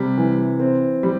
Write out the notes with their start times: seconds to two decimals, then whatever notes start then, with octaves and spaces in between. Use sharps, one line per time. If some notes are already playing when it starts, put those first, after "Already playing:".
Already playing: C3 G3
0.17 E3
0.60 C4
1.03 G3